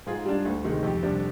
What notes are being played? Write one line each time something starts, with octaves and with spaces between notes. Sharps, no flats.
G#2 F4 G#4
G3 D4
D2
C3 D#3 G#3
F2 G4
C3 G3 D4